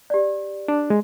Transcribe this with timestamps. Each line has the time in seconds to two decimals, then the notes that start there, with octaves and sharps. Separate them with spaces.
0.10 G4 D5
0.68 D4
0.90 G#3